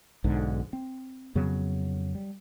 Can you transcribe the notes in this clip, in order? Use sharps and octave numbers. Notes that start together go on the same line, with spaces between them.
B1 G#2 D3
C4
F2 C#3 F#3 B3
G3